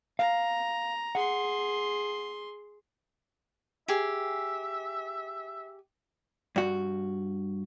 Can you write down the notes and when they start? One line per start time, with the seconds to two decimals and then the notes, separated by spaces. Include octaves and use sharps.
0.19 F5 A#5
1.15 G#4 F#5 C6
3.88 G4 G#4 E5
6.56 G2 F#4